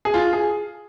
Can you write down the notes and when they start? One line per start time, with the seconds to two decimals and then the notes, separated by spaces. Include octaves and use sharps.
0.05 G#4
0.14 F4
0.33 G#4